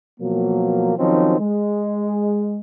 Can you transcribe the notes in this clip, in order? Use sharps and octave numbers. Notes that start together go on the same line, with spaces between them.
B2 F3 F#3 A#3
D#3 F3 F#3 C4 C#4 D#4
G#3